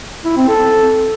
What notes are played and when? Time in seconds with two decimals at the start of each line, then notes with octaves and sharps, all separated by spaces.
0.25 E4
0.37 C4
0.48 A4